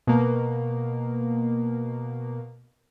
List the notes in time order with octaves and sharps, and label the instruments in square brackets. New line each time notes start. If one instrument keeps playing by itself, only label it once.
[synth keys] B2 A#3